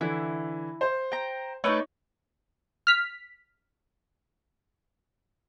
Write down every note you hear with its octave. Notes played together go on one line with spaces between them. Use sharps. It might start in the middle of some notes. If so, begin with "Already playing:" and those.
D3 E3 E4
C5
G5 A#5
A3 D#4 B4 C#5 D5
F6 B6